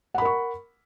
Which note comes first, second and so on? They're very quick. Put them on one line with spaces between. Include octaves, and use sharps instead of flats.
F#5 B5 A#4 C#6